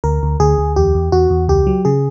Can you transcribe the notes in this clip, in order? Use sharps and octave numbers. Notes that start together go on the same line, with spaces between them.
D2 A#4
D2
D2 G#4
D2
E2 G4
E2
E2 F#4
E2
C#2 G4
F#3
C#3 G#4